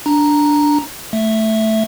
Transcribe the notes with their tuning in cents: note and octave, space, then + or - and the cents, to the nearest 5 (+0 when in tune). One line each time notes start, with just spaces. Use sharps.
D4 +0 A#5 +0
A3 +0 E5 +0